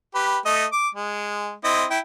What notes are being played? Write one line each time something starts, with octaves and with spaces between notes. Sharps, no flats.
G4 B4
A3 D#5
D6
G#3
C4 E4 D#5
E4 G5